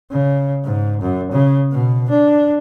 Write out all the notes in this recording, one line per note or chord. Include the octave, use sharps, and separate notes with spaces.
C#3
G#2
F#2
C#3
B2
D4